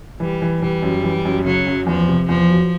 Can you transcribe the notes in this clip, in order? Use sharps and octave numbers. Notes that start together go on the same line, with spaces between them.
E3 G3
E3
E3 G3
F#2
E3
F#2
C#3 F#3
F#2
E2 F3
C3
E2 F3
F#3